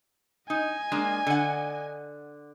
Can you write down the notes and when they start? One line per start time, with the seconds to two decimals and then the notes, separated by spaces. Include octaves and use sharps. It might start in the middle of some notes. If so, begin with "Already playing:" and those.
0.50 D#4 D#5 G#5
0.92 G#3 A#3 D4
1.27 D3 F#5